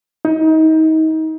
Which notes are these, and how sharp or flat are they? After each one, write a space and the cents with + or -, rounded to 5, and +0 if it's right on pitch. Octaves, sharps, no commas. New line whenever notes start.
D#4 +30